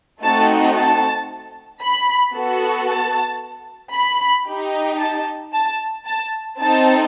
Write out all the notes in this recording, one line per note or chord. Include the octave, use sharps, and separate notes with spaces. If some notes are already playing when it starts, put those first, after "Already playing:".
A3 C4 D#4 F#4 A4 A5
A5
B5
B3 F#4 A4
A5
B5
D#4 G4
A5
A5
A5
C4 D#4 A4 A5